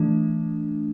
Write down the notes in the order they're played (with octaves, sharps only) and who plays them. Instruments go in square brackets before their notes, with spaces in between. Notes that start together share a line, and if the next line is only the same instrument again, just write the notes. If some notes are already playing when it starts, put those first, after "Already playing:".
Already playing: [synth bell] E3 A3 D4